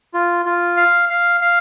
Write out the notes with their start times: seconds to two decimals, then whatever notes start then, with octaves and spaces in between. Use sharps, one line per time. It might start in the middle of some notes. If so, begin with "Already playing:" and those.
0.14 F4
0.45 F4
0.77 F5
1.09 F5
1.41 F5